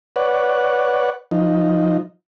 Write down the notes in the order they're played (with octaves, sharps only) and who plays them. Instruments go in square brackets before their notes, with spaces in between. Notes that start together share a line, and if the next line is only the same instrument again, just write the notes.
[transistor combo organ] B4 C#5 D5 F#5
F3 D#4